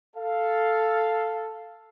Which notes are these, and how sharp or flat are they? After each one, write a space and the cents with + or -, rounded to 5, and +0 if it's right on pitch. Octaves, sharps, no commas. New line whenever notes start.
A4 +0 F5 +0